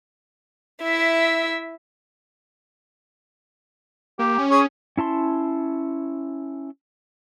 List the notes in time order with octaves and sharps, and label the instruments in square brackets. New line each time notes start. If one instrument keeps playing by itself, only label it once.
[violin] E4 E5
[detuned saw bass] A#3 [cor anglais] G4
[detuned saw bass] C#4
[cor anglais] G#4 [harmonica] C#5
[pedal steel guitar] C#4 E4 A5 C6